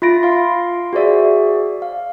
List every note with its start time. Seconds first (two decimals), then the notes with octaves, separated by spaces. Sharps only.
0.02 F4 E5 B5 A6 A#6 D7
0.23 F5 C6
0.93 F#4 G#4 C5 D5 E5
1.82 F5